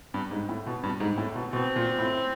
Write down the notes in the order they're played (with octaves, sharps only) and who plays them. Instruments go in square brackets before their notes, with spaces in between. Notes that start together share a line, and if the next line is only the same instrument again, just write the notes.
[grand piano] G2
G#2
A2
B2
G2
G#2
A2
B2
[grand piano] B2 [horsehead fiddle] C4
[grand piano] A#2
A2